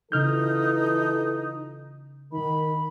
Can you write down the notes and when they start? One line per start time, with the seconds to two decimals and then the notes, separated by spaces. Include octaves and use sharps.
0.12 C#3 E3 D#4 F4 A4 F6 G6
2.32 D#3 B5